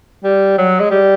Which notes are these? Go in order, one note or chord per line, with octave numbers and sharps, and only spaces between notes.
G3
F#3
G#3
G3